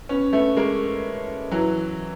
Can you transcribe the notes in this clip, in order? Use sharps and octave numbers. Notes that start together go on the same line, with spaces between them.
B3 C#4
A3 B3
G#3 A#3
E3 F#3